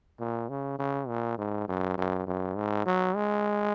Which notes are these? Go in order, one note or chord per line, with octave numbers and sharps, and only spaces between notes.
A#2
C#3
C#3
A#2
G#2
F#2
F#2
F#2
G#2
F#3
G#3